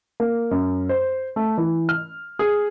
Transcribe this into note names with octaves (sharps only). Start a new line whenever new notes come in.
A#3
F#2
C5
A3
E3
F6
G#4